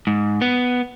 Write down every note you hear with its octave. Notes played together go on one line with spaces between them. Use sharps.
G#2
B3